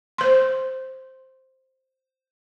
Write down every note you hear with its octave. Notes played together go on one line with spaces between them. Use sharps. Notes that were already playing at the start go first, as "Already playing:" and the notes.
C5 C6